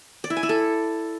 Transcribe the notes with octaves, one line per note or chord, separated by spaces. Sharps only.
D5
E4
G#5
E4
A4